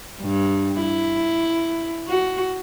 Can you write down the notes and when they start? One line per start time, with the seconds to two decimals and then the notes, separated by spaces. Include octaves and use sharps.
0.23 G2
0.81 E4
2.08 F#4